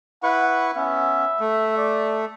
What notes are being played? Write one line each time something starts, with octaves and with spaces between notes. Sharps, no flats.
E4 B4 F#5 C#6
B3 C#4 E5
A3
D5